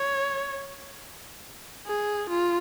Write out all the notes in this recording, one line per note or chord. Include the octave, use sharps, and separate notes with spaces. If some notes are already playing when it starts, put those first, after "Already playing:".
Already playing: C#5
G#4
F4